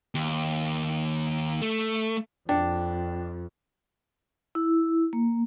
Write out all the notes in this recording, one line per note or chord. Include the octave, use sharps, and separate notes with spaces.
D#2
A3
F2 D4 G5
E4
A#3